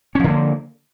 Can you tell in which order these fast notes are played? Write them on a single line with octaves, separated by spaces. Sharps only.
C#4 F3 D3 A#3